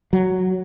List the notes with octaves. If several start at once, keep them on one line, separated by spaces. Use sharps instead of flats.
F#3